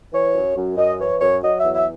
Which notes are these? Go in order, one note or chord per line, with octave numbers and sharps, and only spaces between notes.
E3 C#5
F#2
F#2
F#2 D#5
E3 C#5
F#2 C#5
F#3 D#5
E5
E2
E5